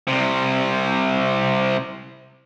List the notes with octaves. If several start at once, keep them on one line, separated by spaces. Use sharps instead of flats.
C2 C3